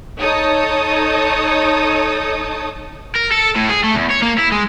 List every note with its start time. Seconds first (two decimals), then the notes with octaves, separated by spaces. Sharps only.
0.19 D#4 A4 C#5 D#6
3.15 A#4
3.31 A4
3.56 A2
3.69 G#4
3.84 A3
3.95 E2
4.11 C#5
4.22 A#3
4.38 E4
4.52 G#3